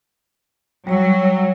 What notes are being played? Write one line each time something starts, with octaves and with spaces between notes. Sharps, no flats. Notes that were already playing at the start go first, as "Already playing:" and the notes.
F#3 G3 C#5 E6